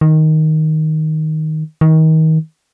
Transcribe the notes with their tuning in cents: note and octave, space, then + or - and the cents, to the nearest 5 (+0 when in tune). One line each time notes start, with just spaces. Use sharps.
D#3 +5
D#3 +30